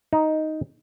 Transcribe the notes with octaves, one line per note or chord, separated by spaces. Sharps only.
D#4